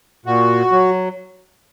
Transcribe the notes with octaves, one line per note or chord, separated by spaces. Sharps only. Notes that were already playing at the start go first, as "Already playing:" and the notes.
A#2 F#4
F#3